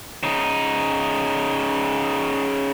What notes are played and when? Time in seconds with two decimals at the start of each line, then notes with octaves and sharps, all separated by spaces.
0.23 C#3 D#4